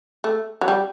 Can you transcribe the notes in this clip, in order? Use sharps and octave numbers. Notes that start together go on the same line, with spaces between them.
A3
F#3
G3